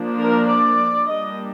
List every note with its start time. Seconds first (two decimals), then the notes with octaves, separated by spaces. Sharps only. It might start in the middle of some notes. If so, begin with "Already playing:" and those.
Already playing: F3 A#3 D4
0.19 A#4
0.49 D5
1.09 G3 A#3 D4 D#5